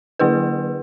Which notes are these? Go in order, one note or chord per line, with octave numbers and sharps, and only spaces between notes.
D3 F#3 A#3 E4 G#4 B4